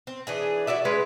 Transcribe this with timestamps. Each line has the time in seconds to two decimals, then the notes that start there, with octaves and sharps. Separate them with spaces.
0.07 C4
0.27 E3 D4 G#4
0.67 E4 F#4 D5 E5
0.85 G#3 C#4 B4